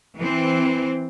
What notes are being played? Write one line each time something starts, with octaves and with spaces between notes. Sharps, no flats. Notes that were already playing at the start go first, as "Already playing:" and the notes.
E3 C4